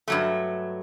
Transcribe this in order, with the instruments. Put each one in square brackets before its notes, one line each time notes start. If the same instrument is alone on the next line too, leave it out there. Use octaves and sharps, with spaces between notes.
[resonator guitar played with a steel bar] G2 F#3 A3